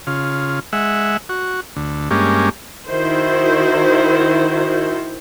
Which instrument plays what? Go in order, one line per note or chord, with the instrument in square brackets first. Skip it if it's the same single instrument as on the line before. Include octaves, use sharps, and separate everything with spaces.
[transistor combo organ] C#3 F4
G#3 E5 F#5
F#4
D2
G2 G#3 A#3 C#4 G4
[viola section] D#3 E4 F#4 C5